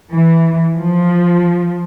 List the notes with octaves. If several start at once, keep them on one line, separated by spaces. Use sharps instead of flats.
E3
F3